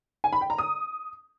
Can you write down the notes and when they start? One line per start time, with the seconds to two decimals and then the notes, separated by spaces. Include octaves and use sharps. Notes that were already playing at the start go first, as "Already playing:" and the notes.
0.24 G#5
0.33 B5
0.41 G5
0.50 A#5
0.58 D#6